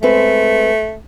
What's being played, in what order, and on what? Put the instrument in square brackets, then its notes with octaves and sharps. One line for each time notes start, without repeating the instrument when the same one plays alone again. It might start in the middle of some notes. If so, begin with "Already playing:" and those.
[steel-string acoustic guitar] G#3 C4 B4 [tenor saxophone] A3